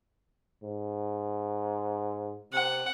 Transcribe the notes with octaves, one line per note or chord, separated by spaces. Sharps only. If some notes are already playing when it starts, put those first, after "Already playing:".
G#2
C3 F#5